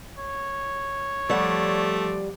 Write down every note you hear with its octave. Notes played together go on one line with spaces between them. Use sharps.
C#5
F3 G3 A3 D5 F#5